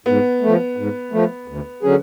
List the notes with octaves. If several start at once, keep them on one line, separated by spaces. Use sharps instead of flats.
G#2 B3
F3 A3
G#2
F3 A3
D2
D3 F#3 C#4 G#4